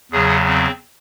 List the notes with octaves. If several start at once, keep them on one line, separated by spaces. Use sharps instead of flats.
E2 C#3 F#3 G#4
C4